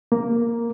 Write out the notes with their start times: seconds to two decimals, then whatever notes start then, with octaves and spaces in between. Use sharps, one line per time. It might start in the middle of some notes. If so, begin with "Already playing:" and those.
0.12 A#3